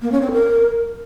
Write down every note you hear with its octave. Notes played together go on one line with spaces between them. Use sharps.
A#3
C#4
C4
A#4